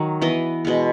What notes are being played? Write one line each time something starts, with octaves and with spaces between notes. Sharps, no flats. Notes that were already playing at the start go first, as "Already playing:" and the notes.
Already playing: D#3 F#3
E3 B3 D#5
B2 G#3 B3